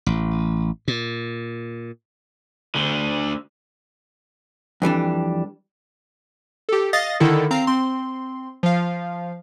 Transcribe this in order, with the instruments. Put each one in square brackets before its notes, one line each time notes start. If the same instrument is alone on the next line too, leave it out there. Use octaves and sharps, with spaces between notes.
[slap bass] A1
A#2
[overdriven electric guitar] D2 D3
[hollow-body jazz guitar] F2 E3 G3 D4
[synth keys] G4 A4
D#5 F5 D#6 A6 A#6
D3 D#3 E4 A4
C4 F5 A#5 C7
C4 C6
F3 F5